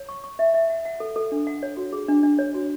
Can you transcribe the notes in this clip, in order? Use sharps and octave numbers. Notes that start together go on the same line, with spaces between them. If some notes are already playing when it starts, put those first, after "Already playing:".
Already playing: C#5
C#6
C#6
E5
E5
F#5
F#5
A4
A4
D4
F#5
C#5
F#4
G#4
D4
D4
C#5
F#4